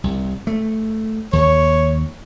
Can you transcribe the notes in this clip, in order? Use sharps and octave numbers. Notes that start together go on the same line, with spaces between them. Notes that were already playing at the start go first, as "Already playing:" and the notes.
C2
A3
D#2 C#5